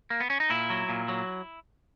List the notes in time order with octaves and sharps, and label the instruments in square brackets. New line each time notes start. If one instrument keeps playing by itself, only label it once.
[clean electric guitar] A#3
B3
C#4
D#4
A#2 E4
F#3
A#2
F#3